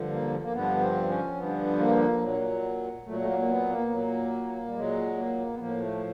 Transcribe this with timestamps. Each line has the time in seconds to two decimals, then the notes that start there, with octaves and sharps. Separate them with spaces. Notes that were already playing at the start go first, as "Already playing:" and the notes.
Already playing: G2 D3 F3
0.11 A#3
0.44 A#3
0.52 G2 D3 F3 B3
0.80 C4
1.09 C#4
1.37 G2 D3 F3 B3
1.79 A#3
2.21 A#2 F#3
3.06 A#2 F#3 A3
3.20 A3
3.28 A#3
3.39 A#3
3.49 B3
3.69 A#3
3.90 A#2 F#3
4.67 G3
4.74 A#2 F#3 G#3
5.17 A#3
5.53 B3
5.59 A2 F3 A#3
5.80 A3